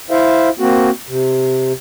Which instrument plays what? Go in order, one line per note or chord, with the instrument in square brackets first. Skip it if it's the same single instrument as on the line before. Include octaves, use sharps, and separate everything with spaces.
[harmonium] E4 C5 E5 F5
A#3 C4 F#4
C3